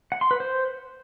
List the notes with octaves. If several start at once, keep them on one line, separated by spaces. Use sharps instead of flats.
F#5
C6
B4
C5